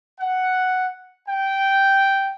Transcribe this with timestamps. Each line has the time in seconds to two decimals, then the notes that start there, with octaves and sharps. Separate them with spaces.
0.20 F#5
1.28 G5